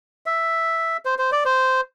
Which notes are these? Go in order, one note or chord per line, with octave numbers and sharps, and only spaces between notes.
E5
C5
C5
D5
C5